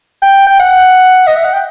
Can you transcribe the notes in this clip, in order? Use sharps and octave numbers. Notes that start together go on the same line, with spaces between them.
G5
G5
F#5
D#5
E5
F#5
G5